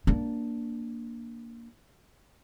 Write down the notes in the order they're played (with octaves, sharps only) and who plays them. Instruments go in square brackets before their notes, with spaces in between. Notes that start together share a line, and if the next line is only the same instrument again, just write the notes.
[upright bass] A#3 D4